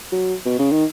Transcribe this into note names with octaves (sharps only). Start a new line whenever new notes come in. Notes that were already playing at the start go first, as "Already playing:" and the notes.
F#3
B2
C#3
D#3